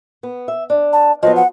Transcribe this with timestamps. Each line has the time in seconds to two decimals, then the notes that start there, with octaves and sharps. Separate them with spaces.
0.23 B3
0.48 E5
0.70 D4
0.93 A5
1.23 F3 F#3 B3 D#5
1.36 F#5